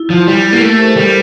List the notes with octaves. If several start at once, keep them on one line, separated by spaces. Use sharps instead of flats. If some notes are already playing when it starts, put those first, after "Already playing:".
Already playing: E4
F3
G3 E4
E4 G4
A#3
A3 G4 A#4
A4 C5
G3 A4 C5